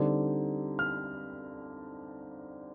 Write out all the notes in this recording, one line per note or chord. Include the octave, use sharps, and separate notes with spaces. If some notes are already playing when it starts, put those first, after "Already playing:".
Already playing: D3 G3 C4 D#4
F6